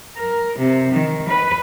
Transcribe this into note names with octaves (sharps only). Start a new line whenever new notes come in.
A#4
C3
D#3
B4